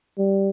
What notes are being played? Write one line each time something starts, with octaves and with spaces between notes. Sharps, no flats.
G3